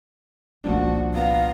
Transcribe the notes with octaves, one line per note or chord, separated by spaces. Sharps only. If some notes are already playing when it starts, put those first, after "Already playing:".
G1 C2 A#2 F3 D4 F#4
B3 F5 A#5